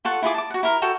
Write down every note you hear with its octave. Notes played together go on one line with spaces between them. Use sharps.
F4 A4 F#5 C#6
E4 F4 G#4 D6
A5 D6
F#4 F#5
E4 A#4 C6
F#4 A4 G5